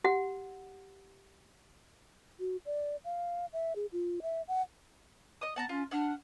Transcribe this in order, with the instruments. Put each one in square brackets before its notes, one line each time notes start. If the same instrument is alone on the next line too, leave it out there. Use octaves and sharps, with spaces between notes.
[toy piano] G4 F#5
[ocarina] F#4
D5
F5
E5
G#4
F4
E5
F#5
[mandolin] D#5 D#6
[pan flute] B3 [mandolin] F#5 A5 A#5
[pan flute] C#4 [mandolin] F4
[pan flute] D4 [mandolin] F#5 F6